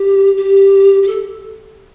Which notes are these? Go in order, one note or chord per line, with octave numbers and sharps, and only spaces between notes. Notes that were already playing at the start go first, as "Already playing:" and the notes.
Already playing: G4
G4
G4
A4